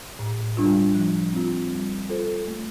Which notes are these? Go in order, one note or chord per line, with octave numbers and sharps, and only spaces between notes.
A2
G3 D4 F4
F3
C4 F4
G3
F4 A4 C5
A3